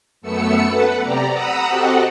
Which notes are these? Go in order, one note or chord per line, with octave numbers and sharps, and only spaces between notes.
F#2 A3 B3 E6 C#7
A4 B4 F#5
C3 G4 D5 A#5
F#5 A#5 B5 D#6 E6
C4 F#4 G4 A4 D#5 F#5